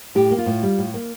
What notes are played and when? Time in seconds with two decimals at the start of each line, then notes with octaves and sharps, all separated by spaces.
0.15 A2 G4
0.31 A#3
0.38 F4
0.46 A2
0.63 G3
0.78 A2
0.94 A#3